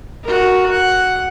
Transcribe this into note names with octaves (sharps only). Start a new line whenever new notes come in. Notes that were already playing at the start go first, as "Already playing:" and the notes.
F#4 A#4
F#5